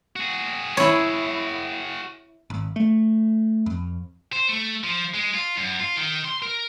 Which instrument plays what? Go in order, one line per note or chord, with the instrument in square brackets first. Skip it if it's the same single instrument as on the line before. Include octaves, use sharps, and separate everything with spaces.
[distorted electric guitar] F#4 G#4
[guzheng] E4 C#5
[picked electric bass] G#1
A3
F2
[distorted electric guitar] C5
A3
F3
G#3
F4
F#2
F4
D#3
C6
A#4